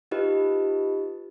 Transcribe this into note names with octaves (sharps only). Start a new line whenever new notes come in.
D#4 F4 G4 B4 D#5